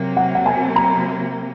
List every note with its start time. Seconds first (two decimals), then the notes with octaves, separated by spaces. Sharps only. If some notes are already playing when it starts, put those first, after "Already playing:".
Already playing: C3 F#3 A#3
0.17 F#5
0.35 F#5
0.46 G#5
0.76 A#5